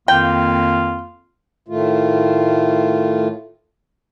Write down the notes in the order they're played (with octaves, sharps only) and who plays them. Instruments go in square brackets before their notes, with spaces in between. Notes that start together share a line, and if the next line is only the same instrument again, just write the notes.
[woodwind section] F2 D#3 A#3 [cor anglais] F4 [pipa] G5
[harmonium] A2 D#3 A3 F4